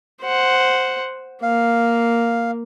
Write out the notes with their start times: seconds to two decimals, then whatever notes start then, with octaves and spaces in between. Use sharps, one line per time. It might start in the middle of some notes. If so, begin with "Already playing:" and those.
0.23 C5 F#5
1.43 A#3 F5